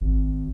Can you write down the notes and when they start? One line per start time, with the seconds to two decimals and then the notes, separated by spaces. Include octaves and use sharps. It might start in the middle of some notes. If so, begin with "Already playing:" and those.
0.01 G#1